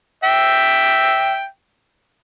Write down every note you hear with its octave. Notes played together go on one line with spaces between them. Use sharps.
E5 G5